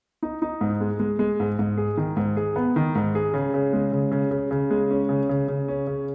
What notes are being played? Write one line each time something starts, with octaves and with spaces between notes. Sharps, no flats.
D#4
D#4
G#2
G#3
G#3
G#3
G#2
G#2
G#4
D#3
G#2
G#4
B3
D#3
G#2
G#4
C#3
C#3
G#3
C#3
C#3
C#3
C#3
G#3
C#4
C#3
C#3
C#3
C#4
C#3